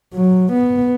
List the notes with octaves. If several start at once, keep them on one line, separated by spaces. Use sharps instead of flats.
F#3
B3